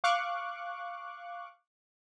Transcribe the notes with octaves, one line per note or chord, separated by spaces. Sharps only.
F5 C#6 D6 F#6